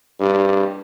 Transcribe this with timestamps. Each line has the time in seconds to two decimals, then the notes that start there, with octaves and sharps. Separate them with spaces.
0.20 G2